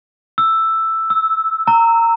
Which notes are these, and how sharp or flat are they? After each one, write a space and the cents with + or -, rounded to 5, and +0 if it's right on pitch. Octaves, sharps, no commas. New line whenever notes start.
E6 +5
E6 -15
A#5 -20